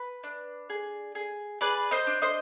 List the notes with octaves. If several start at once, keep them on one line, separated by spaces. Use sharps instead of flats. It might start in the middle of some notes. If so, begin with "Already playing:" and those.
Already playing: B4
D4
G#4
G#4
G#4 B4 D5
C5 D#5
D4
C5 D#5